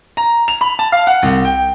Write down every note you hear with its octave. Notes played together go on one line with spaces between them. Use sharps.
A#5
F7
B5
A5
F5
F#5
C2
G5